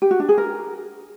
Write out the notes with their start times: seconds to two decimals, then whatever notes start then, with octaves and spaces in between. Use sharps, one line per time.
0.02 G4
0.11 F#4
0.20 D4
0.29 G#4
0.38 A#4